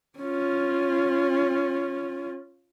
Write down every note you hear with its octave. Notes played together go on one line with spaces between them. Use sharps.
C#4 F4